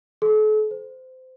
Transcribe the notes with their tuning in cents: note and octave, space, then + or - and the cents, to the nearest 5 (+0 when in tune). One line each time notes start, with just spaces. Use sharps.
A4 -40
C5 -25